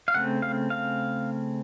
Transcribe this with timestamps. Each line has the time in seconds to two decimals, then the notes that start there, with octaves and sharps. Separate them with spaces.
0.08 F5
0.14 C#3 A3 C4 F#5
0.42 F5
0.70 F5